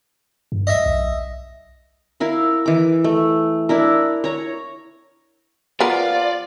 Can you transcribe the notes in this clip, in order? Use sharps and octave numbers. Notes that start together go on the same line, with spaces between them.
G2
D#5 E5
B1
E4 A#4 F5
E3 D6
A3
D4 E4 A#4
C#5 A#5
F3 B3 F4 A#4 D5